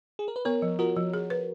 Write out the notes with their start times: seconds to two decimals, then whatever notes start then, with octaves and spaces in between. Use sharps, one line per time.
0.19 G#4
0.28 A#4
0.36 B4
0.45 B3 A#4 C#5
0.62 F3
0.79 F4 F#4 A#4
0.96 F3
1.13 G#4
1.30 B4